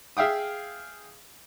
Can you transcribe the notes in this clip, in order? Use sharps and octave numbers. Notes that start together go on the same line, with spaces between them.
G#4 E5 F5 G5 D#6